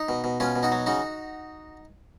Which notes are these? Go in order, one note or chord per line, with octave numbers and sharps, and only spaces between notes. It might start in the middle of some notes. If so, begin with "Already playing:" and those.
Already playing: D#4
B2
B2
B2 C#4 F4
B2
D#4 F#4
F#3
C#3 D#4 F#4